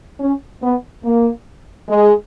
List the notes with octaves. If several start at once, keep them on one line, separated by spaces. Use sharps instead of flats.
C#4
B3
A#3
G#3